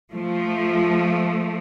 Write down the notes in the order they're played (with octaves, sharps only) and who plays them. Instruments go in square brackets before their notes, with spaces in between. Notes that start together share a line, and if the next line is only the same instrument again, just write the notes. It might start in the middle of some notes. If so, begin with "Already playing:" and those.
[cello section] F3 A3